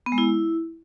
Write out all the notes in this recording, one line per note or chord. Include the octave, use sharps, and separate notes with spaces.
B3
G#3
E4